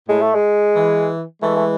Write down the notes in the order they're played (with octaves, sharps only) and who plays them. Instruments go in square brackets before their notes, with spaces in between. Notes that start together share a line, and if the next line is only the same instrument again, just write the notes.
[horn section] A2 [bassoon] G#3
[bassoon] A3
G#3
[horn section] E3
[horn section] E3 G#3 [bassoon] A3
[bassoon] A3